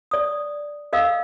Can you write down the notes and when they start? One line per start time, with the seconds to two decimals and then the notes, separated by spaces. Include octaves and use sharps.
0.11 D5 D#6
0.93 A4 D#5 F5 E6